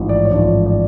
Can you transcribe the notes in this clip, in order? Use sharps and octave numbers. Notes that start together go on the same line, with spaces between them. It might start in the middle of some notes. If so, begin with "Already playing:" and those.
Already playing: A1 G#2 F3
D5
C#5
A1 G#2 F3 D5
D5